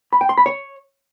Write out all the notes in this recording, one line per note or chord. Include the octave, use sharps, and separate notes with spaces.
B5
G5
C6
B5
C#5